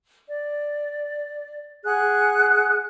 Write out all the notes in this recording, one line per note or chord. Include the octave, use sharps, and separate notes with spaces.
D5
G#4 F#5 F#6